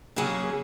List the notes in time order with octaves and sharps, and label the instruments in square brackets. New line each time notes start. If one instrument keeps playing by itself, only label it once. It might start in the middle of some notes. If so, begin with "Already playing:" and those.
[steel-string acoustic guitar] C#3 F#3 A#3 C#4 G#4